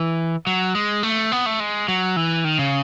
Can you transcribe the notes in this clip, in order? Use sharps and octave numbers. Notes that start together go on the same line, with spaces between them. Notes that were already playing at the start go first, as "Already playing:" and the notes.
Already playing: E3
F#3
G#3
A3
B3
A3
G#3
F#3
E3
D#3
C#3